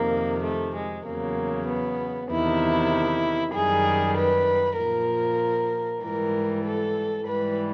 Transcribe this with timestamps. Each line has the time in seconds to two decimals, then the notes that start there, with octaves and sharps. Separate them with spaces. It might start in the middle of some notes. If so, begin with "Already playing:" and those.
Already playing: F2 C3 D#3 A#3
0.43 A3
0.75 G#3
1.06 E2 C#3 F#3 A#3
1.67 B3
2.30 E2 C3 D#3 E4
3.54 F#2 D#3 G3 G#4
4.16 B4
4.78 A#2 F3 A#4
6.02 G#2 E3 G3 A#4
6.64 A4
7.26 G#2 E3 G3 B4